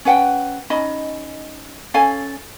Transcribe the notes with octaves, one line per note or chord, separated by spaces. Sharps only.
C#4 B4 F#5 G5
C#4 D#4 D#5 B5
C#4 A4 F5 G#5